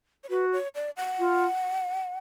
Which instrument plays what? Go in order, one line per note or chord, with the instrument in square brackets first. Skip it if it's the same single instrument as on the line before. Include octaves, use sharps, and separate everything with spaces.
[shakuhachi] C#5
[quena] F#4 [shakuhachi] B4
[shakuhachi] C#5
D5
F#5
[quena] F4